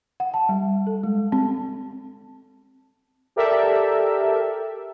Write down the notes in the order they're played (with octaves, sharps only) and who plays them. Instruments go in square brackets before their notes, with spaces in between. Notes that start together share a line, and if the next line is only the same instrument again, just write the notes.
[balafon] F#5
A5
G3
A4
G#3
C4
[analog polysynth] G4 A4 A#4 D5 E5